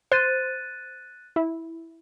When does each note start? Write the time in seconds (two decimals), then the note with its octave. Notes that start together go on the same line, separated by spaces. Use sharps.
0.12 C5 F#6 A6 D#7
1.36 E4